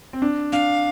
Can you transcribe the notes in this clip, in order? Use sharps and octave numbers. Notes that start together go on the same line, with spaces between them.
C4
D4
D4 F5